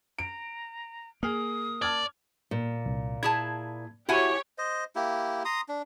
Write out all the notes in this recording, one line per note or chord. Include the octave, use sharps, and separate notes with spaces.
A#5 D7
A#3 G#4 D#6 F6
D5 A5 F6 G#6
A#2
C2
E4 G#4 A5 G#6
E4 F#4 G4 C#5 E5 F#5 G#5
C5 D#5
A#3 E4 G4
A#5 C6 D#6
D4